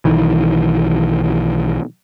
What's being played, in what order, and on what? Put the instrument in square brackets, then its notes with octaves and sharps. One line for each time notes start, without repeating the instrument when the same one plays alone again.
[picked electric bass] B1 D#3 E3